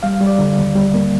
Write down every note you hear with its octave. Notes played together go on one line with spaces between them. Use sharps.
G3 F5
G3
D5
D3
D#2
G3 G4
A#3